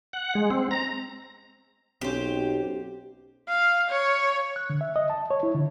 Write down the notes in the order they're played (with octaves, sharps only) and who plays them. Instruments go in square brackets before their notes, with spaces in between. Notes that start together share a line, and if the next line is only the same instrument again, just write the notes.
[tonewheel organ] F#5
G#3
C4
A#5
[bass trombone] B1 [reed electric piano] C4 C#4 [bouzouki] G4 C5
[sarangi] F5
C#5
[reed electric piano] F#6
D3
E5
D#5
A5
C#5
E4
D3